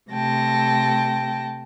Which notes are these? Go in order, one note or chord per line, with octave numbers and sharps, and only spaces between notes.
C3 A3 G5 A5 A#6